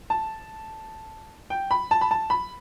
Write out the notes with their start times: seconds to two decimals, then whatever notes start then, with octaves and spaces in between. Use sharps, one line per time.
0.10 A5
1.50 G5
1.71 B5
1.91 A5
2.01 B5
2.11 A5
2.30 B5